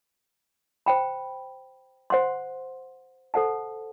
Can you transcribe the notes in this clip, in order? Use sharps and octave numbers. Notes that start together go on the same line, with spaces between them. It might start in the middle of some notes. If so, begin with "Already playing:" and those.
C5 G5 B5
C5 F#5 C6
A4 C5 F#5 A5